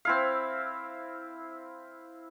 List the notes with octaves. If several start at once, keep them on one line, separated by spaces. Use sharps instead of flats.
C4 E4 F5